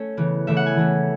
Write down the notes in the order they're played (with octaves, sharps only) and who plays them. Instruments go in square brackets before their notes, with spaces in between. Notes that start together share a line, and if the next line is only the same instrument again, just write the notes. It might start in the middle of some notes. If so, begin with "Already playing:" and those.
Already playing: [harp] A3 C#4
C#3 E3 B3
C#3 E3 A3 E5
F#5
G#5
E3 A3 C#4